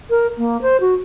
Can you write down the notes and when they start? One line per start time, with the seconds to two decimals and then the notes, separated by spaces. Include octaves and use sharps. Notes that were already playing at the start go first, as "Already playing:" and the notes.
0.10 A#4
0.38 A#3
0.62 C5
0.81 F#4